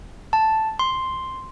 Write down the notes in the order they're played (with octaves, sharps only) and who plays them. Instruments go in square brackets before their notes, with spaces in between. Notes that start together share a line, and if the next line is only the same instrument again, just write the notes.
[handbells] A5
C6